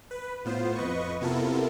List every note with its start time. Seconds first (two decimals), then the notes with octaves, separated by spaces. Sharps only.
0.11 B4
0.45 A2 B3 F4 C5
0.75 F2 B4 D#5 C#6
1.21 C3 B3 E4 F4 A4 A#4